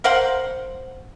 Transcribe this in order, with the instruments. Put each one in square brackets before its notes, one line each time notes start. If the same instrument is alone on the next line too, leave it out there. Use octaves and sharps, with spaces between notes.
[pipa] A#4 C5 F5 F#5